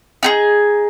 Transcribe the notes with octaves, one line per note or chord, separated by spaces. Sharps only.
D#4 G4 G#4